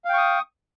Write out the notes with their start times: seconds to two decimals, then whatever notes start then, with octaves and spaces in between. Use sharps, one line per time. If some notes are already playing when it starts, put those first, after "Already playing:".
0.05 F5
0.09 G5
0.14 C#6
0.18 D#6